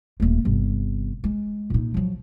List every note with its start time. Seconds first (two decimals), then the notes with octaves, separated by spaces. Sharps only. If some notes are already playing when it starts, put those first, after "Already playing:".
0.20 D#1 A3
0.45 G1 C3
1.24 G#3
1.70 A#2 D#4
1.94 F3 F#3